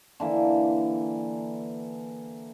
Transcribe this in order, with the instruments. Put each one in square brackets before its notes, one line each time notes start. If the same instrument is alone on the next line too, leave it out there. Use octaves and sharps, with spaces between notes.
[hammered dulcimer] D3 E3 A#3